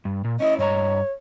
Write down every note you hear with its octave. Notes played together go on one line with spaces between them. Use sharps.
G2
A#2
C#4 E4 D#5
G2 C#5 D#5 A#5